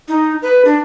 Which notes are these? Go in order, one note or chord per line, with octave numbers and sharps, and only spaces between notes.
D#4
B4
D4